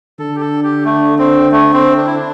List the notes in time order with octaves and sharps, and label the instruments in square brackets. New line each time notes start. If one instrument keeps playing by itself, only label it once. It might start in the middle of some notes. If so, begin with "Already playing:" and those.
[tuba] D3 [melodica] A4
[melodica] G4
A4
G4
A3
C4
A3
C4
D4
E4
D4